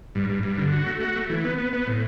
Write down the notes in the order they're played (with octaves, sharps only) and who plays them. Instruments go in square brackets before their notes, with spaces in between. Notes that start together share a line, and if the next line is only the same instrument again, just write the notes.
[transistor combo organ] G2
G2
G2
D3
F#4
A3
F#4
A3
E3
B3
B3
B3
A2